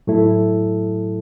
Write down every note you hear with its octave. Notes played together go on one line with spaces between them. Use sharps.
A2 F#3 A3 E4 A4